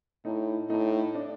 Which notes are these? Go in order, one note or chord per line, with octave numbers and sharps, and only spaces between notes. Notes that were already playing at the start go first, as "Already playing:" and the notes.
A2 D#4
A2 D#4
D4